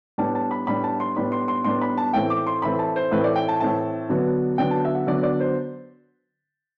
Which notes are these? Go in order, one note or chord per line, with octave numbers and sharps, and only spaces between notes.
A2 G3 B3 D4 A5
A5
B5
A2 G3 B3 D4 B5
A5
C6
A2 G3 B3 D4 B5
C6
C6
A2 G3 B3 D4 C6
B5
A5
A2 E3 A3 C4 G5
D6
C6
A2 E3 A3 C4 B5
A5
C5
A2 E3 A3 C4 B4
D5
G5
A5
A2 E3 A3 C4 A5
D3 F#3 B3 D4
D3 F#3 B3 D4 G5
A5
E5
F#5
D3 F#3 B3 D4 D5
D5
C5